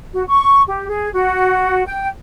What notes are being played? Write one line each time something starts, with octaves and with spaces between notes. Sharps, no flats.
F#4
C#6
G4
G#4
F#4
G5